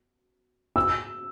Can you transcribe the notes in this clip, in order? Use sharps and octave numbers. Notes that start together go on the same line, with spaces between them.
E6